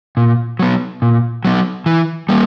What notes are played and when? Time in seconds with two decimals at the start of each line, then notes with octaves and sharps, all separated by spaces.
0.17 A#2
0.59 F#3 B3
1.02 A#2
1.45 F#3 B3
1.86 E3
2.29 G3 A#3